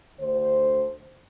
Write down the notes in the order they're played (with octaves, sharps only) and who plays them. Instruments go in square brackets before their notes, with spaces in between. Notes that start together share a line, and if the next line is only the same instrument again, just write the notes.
[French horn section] D2 D3 C5